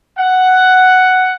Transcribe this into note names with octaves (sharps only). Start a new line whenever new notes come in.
F#5